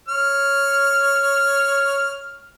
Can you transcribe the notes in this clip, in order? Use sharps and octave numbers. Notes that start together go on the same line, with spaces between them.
C#5 F6